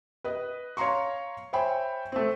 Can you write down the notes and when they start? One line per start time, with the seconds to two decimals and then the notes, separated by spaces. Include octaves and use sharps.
0.24 B4 D#5
0.77 C#5 F5 A#5 C6 C#6
1.53 C5 C#5 E5 G5 G#5 B5
2.12 A3 C4